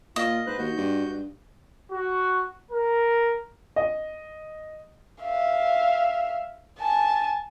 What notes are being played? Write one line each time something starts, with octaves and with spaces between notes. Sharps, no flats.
A#2 F4 D#5
G#2 B4 C5 F#6
D#2 F#4 G6
G2
G2
F#4
A#4
D#5
E5 F5
G#5 A5